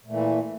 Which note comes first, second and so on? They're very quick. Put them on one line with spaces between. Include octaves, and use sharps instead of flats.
A#2 A3 E3